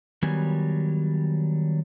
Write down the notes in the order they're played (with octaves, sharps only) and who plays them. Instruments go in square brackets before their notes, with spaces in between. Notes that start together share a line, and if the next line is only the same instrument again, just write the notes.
[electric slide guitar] D#3 F#3 G3 B3 G#5